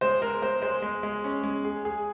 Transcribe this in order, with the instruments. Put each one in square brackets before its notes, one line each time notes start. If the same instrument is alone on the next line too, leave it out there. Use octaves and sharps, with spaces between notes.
[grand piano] G#3 [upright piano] C5
[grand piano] G#3 [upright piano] A#4
[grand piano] G#3 [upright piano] C5
[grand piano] G#3 [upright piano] C5
[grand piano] G#3
G#3
C#4
G#3
G#4
G#4